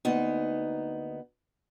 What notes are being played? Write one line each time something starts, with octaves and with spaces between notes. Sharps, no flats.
D2 A#3 B3 D#4